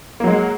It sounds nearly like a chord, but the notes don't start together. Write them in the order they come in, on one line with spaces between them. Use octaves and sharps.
A#3 F#3 G#3